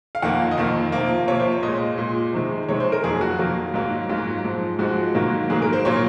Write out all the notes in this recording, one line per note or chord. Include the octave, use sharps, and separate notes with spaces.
F5
F2 D#3 A#3 F#5
D#5
F2 D#3 A#3 F5
C3 F3 A#3
C3 F3 A#3 C#5
C5
C#5
A#2 G#3 D#5
A#2 G#3
C3 D#3 G#3
C3 D#3 G#3 C#5
C5
A#4
F2 D#3 F#3 A#3 G#4
F#4
F2 D#3 F#3 A#3 F4
G#2 F#3 A#3
G#2 F#3 A#3 F4
G#2 F3 G#3
G#2 F3 G#3 F#4
G#2 D#3 F#3 A#3
G#2 D#3 F#3 A#3 G#4
A#4
C5
A#2 F#3 A#3 C#5